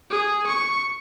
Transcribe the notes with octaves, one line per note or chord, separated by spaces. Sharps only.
G#4
C#6